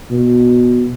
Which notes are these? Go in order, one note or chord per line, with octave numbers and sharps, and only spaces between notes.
B2